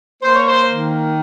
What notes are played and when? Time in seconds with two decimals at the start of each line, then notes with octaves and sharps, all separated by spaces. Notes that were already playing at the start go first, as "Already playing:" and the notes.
0.22 A#3 C5
0.35 C#5
0.48 C5
0.68 D#3